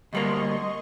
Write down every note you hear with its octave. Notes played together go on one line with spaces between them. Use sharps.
D2 G3 A#3 D#5 C6 C#6